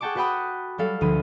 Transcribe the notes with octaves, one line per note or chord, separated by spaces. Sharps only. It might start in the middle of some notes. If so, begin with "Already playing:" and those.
G#4 F#5 G5 A5 C#6 D6
F#4 B4 F#5 G5 B5 D#6
F#3 G3 A4 F5
D2 F3 B5 D#7